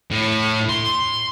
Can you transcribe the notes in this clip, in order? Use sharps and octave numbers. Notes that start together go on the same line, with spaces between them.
A2
C6